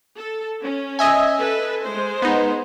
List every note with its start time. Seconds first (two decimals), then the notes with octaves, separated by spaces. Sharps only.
0.17 A4
0.62 C#4
0.99 D#5 E5 G#5
1.37 A4 B4
1.84 G#3 C5
2.22 B3 D#4